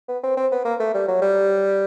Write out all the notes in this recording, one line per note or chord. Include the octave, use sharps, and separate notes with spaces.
B3
C4
C4
B3
A#3
A3
G3
F#3
G3